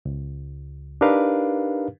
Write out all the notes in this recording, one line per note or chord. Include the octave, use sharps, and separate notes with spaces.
C#2
D4 D#4 G4 A#4 B4 F5